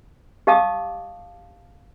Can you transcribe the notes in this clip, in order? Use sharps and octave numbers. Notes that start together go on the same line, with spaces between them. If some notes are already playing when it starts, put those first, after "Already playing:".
G4 D#5 F5 A5 D6 D#6